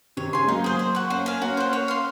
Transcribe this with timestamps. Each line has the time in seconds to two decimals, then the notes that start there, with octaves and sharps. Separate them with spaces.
0.17 C3 D#3 C#5
0.33 C#3 G#5 C6
0.43 G#3
0.48 F#3 A#3 D#4
0.64 G#4 C5
0.79 C5
0.95 F#5 C#6
1.10 A#3 C#4 C5
1.26 F5 G#5
1.41 A#3 C#4 F#4
1.57 C5 F#5
1.73 C#5
1.88 F5 C6